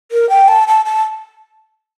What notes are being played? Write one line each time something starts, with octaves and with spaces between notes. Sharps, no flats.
A#4
G5
A5
A5
A5